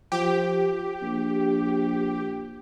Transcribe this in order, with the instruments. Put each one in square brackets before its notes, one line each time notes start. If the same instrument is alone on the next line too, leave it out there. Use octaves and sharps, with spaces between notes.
[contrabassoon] F3 [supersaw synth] G4
[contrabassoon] A#1